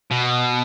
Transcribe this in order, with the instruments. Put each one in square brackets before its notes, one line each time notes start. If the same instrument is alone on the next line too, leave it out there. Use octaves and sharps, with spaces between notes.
[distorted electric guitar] B2